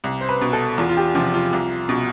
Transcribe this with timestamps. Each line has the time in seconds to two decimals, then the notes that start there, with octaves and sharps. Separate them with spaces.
0.04 C2
0.21 C5
0.29 B4
0.41 B2
0.53 A4
0.78 E2 F4
0.89 F4
0.97 G4
1.15 C3 F3 F4
1.34 F4
1.53 C2
1.89 B2